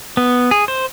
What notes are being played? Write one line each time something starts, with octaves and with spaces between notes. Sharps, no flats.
B3
G#4
C5